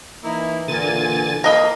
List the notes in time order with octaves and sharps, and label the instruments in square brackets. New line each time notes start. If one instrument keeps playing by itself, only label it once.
[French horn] E3 [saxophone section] A#3 D#4 E4
[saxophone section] A#2 [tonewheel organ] D3 G#5 A6
[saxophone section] F3 A#3 [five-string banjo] A#4 D#5 B5